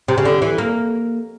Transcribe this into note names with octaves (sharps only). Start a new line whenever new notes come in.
C3
C#3
D3
E3
A#3